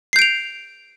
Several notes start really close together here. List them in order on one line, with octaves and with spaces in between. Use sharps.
C7 G6 D7 F7